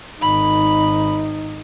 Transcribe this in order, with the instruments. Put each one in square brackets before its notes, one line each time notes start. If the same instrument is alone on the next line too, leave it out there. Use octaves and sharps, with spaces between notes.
[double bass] G#1 D#4 [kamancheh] B5